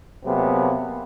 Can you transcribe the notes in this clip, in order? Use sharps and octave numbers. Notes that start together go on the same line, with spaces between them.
C3 F#3 A#3 B3 G#4